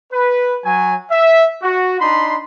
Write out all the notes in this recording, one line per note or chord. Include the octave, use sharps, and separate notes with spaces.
B4
F#3 G#5
E5
F#4
D4 D#4 B5 C6